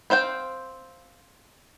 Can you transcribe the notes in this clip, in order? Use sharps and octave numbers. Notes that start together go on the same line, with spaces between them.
C4 C5 F5 G5